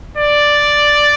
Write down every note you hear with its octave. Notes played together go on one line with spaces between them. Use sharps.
D5